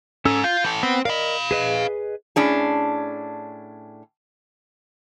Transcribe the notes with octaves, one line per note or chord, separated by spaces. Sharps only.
G#2 C#4 A4 E6
F4 G6
E3 A4
B3 C4
A#4 D5 D#5 F5 B5
G#4 B4 D#5
A2 C#4 D4 G#4